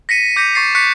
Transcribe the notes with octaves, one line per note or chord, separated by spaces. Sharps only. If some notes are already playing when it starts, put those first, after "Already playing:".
A#6 B6 C#7 D#7
D6 G6 A#6 B6 C#7
C#6 A6 C7
C#6 F#6 B6 C#7